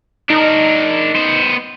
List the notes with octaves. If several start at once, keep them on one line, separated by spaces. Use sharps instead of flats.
D4 D#4 A#4
B3 C5